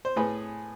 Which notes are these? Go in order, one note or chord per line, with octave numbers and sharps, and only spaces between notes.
C5
A2 G#4 B4